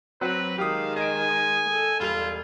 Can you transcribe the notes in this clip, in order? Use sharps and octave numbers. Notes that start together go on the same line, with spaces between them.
F#3 C4 F#4 B4
D#3 G#3 G4 F5 D#6
D#5 G#5 D7
A4
E1 G3 F4 F7